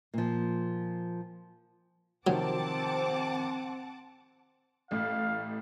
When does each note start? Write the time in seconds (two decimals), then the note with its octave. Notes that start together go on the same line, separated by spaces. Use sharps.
0.14 A#2 F3
2.27 C3 D#3 F3 F#3 C4 F#5 A5 D6
4.91 A1 A2 F5